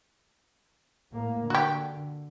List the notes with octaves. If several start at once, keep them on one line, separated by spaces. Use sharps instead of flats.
A2 A#3
D3 F#4 G4